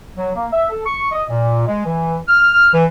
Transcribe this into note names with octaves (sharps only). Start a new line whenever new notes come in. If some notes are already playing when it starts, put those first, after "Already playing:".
F#3
A#3
E5
A4
C#6
D#5
A#2
G#3
E3
F6
E3